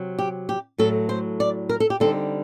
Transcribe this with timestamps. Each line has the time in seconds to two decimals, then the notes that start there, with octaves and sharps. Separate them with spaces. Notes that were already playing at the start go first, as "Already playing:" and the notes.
Already playing: C3 F#3 C4
0.19 G4
0.49 G4
0.78 A2 F#3 A3 A4
1.09 C5
1.40 D5
1.69 A#4
1.80 A4
1.90 G4
2.00 D3 G3 C4 D#4 A4